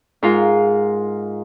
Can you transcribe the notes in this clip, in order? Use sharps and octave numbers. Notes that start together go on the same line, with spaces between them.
G#2 F4 A#4